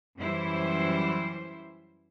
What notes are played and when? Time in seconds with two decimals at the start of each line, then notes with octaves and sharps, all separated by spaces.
0.18 F#2 E3 G3 E4 C5